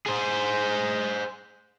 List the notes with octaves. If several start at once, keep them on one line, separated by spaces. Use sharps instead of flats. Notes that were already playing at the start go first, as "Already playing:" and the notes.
G#4 C5